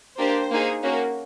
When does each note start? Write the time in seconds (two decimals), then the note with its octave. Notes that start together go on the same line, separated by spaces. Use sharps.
0.18 A#3 D4 G4 C5
0.51 A#3 D#4 G#4
0.83 A#3 C#4 F#4